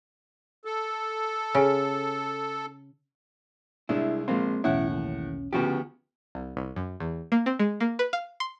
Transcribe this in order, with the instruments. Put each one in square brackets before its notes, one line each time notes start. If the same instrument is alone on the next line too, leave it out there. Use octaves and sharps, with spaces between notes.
[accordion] A4
[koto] C#3
[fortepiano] C2 G#3 [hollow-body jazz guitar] D4 E4
[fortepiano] A#1 [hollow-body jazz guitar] G#3 A#3 C4
[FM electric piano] B1 E2 C#4 [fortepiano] A2 F#5 [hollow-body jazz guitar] E4
[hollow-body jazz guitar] D#2
[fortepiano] D2 C#3 F3 [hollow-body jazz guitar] B3 F#4 G4
[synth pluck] C2
C2
F#2
E2
A#3
C4
G#3
A#3
B4
F5
C6